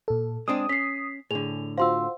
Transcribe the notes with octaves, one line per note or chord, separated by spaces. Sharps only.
A#2 A4
G#3 C4 D4 D#6
C#4 B6 C7
A2 D3 G#4 F7
F4 F#4 C5 F5 C6 E6